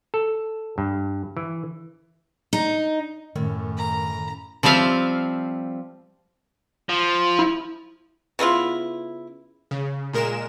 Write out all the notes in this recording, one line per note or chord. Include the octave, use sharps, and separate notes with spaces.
A4
G2
E3
D#4
F#2 A2 D#3
A#5
F3 G3 C4 E5 F5
F3
E4
C#3 B3 E4 F4
C#3
A#2 G#3 A#4 E7